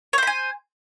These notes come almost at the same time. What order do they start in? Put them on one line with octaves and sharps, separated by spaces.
C#5 C5 B5 G#5